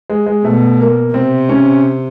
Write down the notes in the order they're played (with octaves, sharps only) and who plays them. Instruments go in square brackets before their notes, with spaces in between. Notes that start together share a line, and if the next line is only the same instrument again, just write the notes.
[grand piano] G#3
G#3
[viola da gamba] B2 [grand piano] A3
[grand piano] A#3
[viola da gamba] C3 [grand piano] C4
[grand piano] C#4